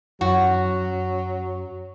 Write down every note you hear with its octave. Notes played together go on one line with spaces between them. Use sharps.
F#2 F#3 F#4